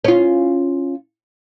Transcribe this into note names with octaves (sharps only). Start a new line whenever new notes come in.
C#4 F4